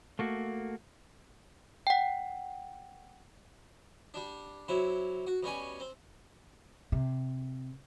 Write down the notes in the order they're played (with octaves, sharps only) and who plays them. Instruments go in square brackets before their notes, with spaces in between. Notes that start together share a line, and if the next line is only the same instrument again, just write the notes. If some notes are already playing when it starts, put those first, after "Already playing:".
[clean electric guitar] A3 A#3 F#4
[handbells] F#5 G5
[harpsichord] G3 D4
C3 F#3 E4
F#4
B2 G3 C#4 G#5
C4
[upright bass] C3